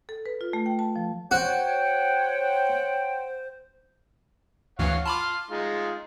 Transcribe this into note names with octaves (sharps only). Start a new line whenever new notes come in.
A4
B4
F4
A3
G5
A5
F3
F#4 C5 C#5 F#5 G5
D2 G2 E3 C#5 F5 F#5
A5 B5 C6 D6 F6
G#3 D#4 F4